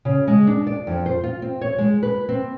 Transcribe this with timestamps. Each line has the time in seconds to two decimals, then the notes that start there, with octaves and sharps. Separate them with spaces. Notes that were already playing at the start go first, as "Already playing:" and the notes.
0.05 C#3
0.27 G#3
0.47 D4
0.67 D5
0.87 F2
1.06 C5
1.24 F4
1.42 C4
1.61 C#5
1.78 G#3
2.03 B4
2.29 C4